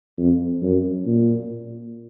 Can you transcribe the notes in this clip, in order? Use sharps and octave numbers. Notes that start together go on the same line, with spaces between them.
F2
F#2
A#2